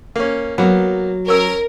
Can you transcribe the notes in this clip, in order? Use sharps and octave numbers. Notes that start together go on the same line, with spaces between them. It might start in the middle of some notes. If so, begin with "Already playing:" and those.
A#3 C#4
F#3 A#3 B3
C#4 A#4 E6